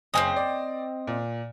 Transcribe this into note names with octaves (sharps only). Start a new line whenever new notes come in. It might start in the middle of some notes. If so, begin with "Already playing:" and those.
F#1 C4 C#4 D#5 G#5
D5
A#2